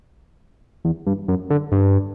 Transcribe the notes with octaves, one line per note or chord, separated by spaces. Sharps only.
E2
G2
F#2
D3
G2